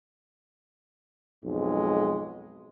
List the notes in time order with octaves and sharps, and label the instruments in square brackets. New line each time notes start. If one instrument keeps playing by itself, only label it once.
[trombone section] B1 F2 G#2 G#3